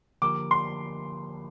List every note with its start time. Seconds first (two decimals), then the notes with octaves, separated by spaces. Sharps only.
0.22 D3 F3 A#3 G4 A#4 D6
0.51 C6